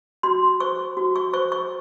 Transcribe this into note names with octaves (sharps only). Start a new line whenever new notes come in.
F#4 C6
C5 C#6
F#4
C#6
C5 C#6
C#6